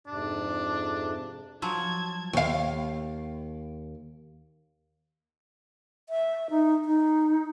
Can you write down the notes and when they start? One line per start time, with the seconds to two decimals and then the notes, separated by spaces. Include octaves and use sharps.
0.07 F2 G#2 C3 D4
1.62 F3 F#3 A5 G#6
2.33 D#2 F5
6.09 E5
6.50 D#4
6.85 D#4